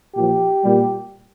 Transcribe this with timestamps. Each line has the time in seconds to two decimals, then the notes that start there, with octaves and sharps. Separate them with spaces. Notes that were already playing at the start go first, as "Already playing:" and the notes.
0.15 A#2 F3 G4
0.63 A#2 G3